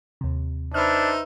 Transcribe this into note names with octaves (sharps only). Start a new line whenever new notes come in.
D#2 C3
D4 D#4 B4 C5 E5 F6